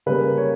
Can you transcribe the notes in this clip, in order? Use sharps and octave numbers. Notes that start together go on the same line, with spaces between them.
C#3 G3 A#3 B4
C#5